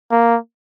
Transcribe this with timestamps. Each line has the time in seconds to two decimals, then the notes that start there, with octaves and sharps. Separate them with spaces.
0.11 A#3